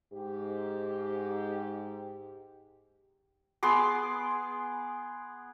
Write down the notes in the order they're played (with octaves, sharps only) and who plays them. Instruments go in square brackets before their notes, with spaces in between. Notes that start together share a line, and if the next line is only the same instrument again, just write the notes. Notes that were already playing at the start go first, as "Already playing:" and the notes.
[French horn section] G#2 G4
[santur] B3 G#4 C6 D6